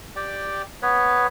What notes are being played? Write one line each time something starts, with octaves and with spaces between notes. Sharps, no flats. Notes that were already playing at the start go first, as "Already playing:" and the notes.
G4 D5 G5
B3 B4 C#5